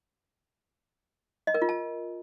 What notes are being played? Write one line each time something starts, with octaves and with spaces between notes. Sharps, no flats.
D#5
A#4
F4
A5